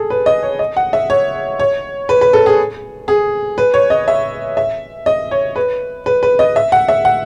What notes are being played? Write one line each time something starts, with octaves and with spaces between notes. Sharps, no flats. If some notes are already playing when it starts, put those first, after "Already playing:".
Already playing: G#4 A4
B4
D#5
C#5
D#5
F#5
E5
C#5
C#5
B4
B4
A4
G#4
G#4
B4
C#5
D#5
E5
E5
D#5
C#5
B4
B4
B4
D#5
E5
F#5
E5
F#5